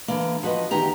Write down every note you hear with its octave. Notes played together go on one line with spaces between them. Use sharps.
D3 E3 A#3
F3 F#4 B4 D#5
E2 D#3 G4 A#5